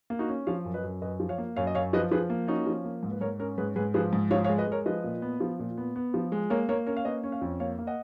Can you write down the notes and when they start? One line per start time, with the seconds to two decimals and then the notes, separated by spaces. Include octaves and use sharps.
0.10 A#3
0.19 D#4 F#4
0.29 C#4
0.47 F3 C#5 F5
0.65 F#2
0.74 B4 D#5
0.83 F#2
1.02 F#2 B4 D#5
1.20 F3
1.29 C#5 F5
1.38 A#3
1.56 F#2 C#5 F5
1.67 D#5
1.75 F#2 C#5 F5
1.93 F3 B4 D#5
2.11 F3 G#4 B4
2.30 A#3
2.48 C#4 D#4 F#4
2.66 F3
2.85 A#3
3.03 G#2
3.11 B4
3.21 G#2 A#4 C#5
3.39 C#4 A#4 C#5
3.58 G#2 G#4 B4
3.76 G#2 G#4 B4
3.94 F3 G#4 B4
4.13 G#2
4.31 F3 C#5 F5
4.44 C#5 F5
4.49 G#3
4.58 B4 D#5
4.67 G#3 A#4 C#5
4.86 F3 B4 D#5
5.04 A#2
5.22 B3
5.40 F3
5.59 A#2
5.78 B3
5.96 B3
6.14 F3
6.32 G#3
6.50 A#3 A#4 C#5
6.69 A#3 A#4 C#5
6.86 C#4 A#4 C#5
6.97 F5
7.05 A#3 B4 D#5
7.24 C#4
7.32 C#5 F5
7.41 F2
7.60 A#3 C#5 F5
7.79 A#3
7.87 D#5 F#5